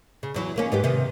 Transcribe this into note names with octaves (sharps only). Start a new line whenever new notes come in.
C#3
E2 F#3 E4
D#3 A#3 C#4
G#2 B3 G4
C3 D#3 B3